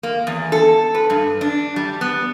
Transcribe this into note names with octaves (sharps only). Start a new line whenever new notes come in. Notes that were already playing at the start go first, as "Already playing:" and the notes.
A#3
E2
A4
B4
G2
D4
G3
B3